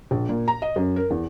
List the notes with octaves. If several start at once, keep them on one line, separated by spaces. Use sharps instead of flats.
A#1
A#2
A#5
D#5
F#2
A#4
E2